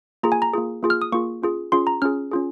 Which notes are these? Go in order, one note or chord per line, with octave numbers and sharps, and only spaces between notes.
A#3 F4 G#4 A#5
G#5
A#5
A#3 F4 G#4
A#3 F4 G#4
F6
D#6
A#3 F4 G#4 C#6
C#4 F4 G#4
C#4 F4 G#4 C6
A#5
C#4 F4 G#4 F6
C#4 F4 G#4